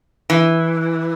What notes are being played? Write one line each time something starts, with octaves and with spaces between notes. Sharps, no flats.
E3